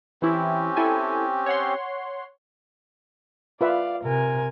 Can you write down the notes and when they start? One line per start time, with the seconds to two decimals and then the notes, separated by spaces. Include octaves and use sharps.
0.22 E3 C4 C#4 E4 G4
0.77 E4 A4 G#5
1.46 C#5 F#5 C6
3.61 F4 B4 D5 E5 F5
4.03 C3 A#4 G#5